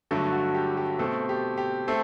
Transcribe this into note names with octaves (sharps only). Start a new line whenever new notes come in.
G2 D3 F#3 A3 A4
F#4
G4
G4
B2 A3 C4 A4
G4
G4
A3 C4 A4